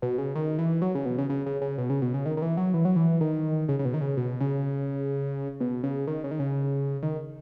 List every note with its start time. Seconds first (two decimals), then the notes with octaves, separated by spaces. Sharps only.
0.02 B2
0.18 C#3
0.35 D#3
0.58 E3
0.82 F#3
0.95 C#3
1.06 B2
1.18 C#3
1.29 C#3
1.46 C#3
1.61 C#3
1.78 B2
1.90 C#3
2.02 B2
2.14 C#3
2.26 D#3
2.37 D#3
2.42 E3
2.57 F#3
2.74 E3
2.85 F#3
2.96 E3
3.21 D#3
3.69 C#3
3.79 C#3
3.85 B2
3.94 D#3
4.01 C#3
4.17 B2
4.40 C#3
5.60 B2
5.83 C#3
6.07 D#3
6.24 C#3
6.31 D#3
6.39 C#3
7.03 D#3